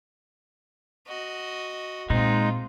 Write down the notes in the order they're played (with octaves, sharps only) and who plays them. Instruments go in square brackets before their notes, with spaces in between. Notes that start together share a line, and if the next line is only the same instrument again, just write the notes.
[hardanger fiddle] F#4 D#5
[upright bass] A#2 [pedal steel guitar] G#3 D#4 [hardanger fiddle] C4 F4